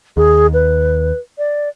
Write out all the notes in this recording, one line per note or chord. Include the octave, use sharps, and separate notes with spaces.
D#2 G#4
B4
D5